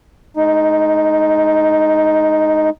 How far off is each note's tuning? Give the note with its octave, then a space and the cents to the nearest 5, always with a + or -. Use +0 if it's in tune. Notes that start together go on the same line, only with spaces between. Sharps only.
G#3 +30 D#4 +0